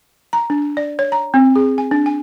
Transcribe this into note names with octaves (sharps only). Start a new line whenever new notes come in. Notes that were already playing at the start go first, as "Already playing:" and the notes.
A#5
D4
D5
C#5
A#5
C4
G#4
G#5
D4
G#5